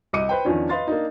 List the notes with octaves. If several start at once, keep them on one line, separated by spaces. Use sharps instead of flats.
C2 D#5 D6 C#7 D#7
B4 C5 G5
E2 D#3 F3 C#4 D4
B4 D#5 F5 C6 A6
A#3 D4 D#4